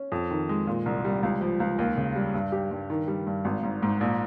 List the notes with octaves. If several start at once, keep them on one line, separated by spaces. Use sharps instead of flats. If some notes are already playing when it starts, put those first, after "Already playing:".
Already playing: C#4
F2
D#3
G#3
A#2
C2
G3
C#2
F3
C#2
D#2
C#3
G3
G2
G4
G2
D#3
G3
G2
G#1
G#2
G#2
A#1